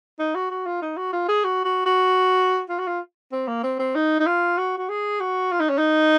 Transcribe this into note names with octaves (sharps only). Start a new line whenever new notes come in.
D#4
F#4
F#4
F4
D#4
F#4
F4
G#4
F#4
F#4
F#4
F4
F#4
F4
C4
A#3
C4
C4
D#4
D#4
F4
F#4
F#4
G#4
F#4
F4
D#4
C#4
D#4